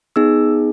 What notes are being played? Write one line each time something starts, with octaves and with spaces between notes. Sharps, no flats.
B3 D#4 G#4 E6